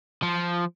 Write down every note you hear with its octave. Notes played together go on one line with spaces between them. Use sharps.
F3